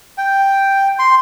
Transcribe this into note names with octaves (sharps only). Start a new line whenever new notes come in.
G5
C6